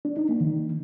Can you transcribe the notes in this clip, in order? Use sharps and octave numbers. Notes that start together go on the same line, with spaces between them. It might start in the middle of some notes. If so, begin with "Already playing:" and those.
D4
D#4
A#3
D#3